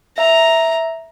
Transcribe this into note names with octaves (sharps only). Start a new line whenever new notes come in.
E5 A#5